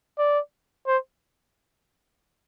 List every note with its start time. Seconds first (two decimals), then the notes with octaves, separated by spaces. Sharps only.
0.19 D5
0.87 C5